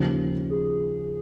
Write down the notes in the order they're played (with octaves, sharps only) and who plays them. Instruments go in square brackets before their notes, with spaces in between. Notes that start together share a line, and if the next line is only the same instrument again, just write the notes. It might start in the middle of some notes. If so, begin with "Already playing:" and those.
Already playing: [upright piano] D#2 C#3 F3
[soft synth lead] G#4